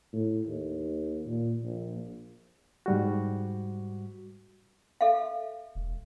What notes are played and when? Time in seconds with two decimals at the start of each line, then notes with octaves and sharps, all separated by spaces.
0.13 A2
0.47 D#2
1.26 A#2
1.64 A#1
2.86 G#2 G3 F#4
5.01 A4 E5 F5
5.75 E1